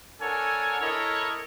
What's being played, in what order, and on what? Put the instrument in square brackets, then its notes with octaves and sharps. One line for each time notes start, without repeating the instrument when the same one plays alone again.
[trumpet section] D4 A4 A#4 C#5 F#5 G#5
E4 A4 A#4 C#5 D#5